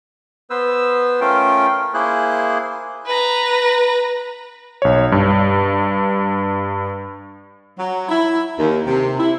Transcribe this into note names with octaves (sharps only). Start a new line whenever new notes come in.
B3 B4 C5 E6
A3 C#4 F4 A#4 G5
A#3 E4 G#4 C5 F#6
B4 A#5
B1 C#5
G2
F#3
E4
D#2
C3
E4